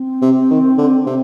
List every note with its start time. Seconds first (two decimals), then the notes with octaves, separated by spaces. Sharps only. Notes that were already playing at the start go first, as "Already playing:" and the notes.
Already playing: C4
0.21 C3
0.50 D#3
0.78 D3
1.06 C3